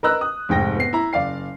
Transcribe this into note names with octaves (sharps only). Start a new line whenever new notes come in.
A#4 B4 D#5 A#5 E6 F#6
D#6
F1 G#2 G5 A#6
B3 C7
E4 A#5
F#1 D5 F5 C7